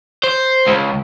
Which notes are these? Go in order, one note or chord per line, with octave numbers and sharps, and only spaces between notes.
C5
C#2